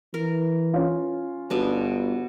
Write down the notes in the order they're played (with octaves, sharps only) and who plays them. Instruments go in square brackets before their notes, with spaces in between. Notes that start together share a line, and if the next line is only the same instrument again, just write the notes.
[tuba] E3 [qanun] A#4
[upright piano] C#4 F4
[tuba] G1 [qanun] B2 B3 D4